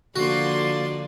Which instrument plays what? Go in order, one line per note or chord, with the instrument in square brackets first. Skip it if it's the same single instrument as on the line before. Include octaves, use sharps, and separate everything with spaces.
[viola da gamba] D3 F3 A#3 [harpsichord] F#4 [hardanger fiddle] D5 C6